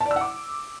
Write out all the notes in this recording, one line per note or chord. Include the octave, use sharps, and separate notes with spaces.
A5
D5
E6
F#5
D6